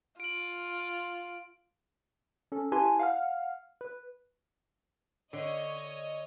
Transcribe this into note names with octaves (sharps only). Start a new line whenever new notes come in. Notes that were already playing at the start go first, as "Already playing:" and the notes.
F4 D7 F#7
C#4 A4
E4 G4 B4 G#5 A5 C6
F5 F#5 F6
B4
D3 C#5 D#5